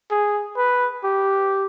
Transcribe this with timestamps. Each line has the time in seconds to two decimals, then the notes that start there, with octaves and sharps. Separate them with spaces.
0.11 G#4
0.57 B4
1.04 G4